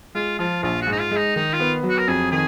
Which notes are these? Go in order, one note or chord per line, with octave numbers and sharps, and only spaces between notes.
G#3 F4
F3 F4
A#1 F4
F#4
G#2
D#4
F4
G#3
D#4
D#3 D#4
F4
B3
F#3
F#4
A#4
F2 G#4
D#3 G#4